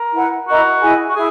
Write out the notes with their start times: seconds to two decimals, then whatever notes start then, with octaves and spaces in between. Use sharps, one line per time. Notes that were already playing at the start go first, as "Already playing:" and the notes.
Already playing: A#4
0.13 E4 B4 F#5
0.47 E4 F#4 A#4 D#5 A#5
0.81 E4 G#4 D#5 G#5
1.08 F#4
1.15 E4 G#4